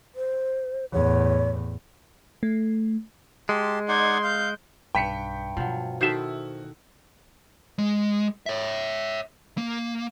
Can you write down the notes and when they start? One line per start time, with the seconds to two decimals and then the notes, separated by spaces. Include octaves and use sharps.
0.15 C5
0.92 E2 A2 C#5
2.43 A3
3.49 G#3 G4 A5 C6
3.88 D#4 D5 F#5 C6 G#6
4.24 F5 G6
4.95 B1 G2 G5 B6 C#7
5.57 B2 F3 F#3 A#3
6.01 D#3 E4 F#4 A4 C5 E5
7.78 G#3
8.46 C#5 E5
9.58 A#3